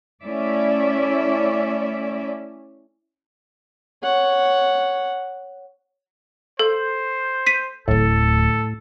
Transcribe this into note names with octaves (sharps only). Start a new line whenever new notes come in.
A3 C#4 E4 D5 E5
C#5 F#5
A4 C5
B6 D#7
D1 D2 A2 A4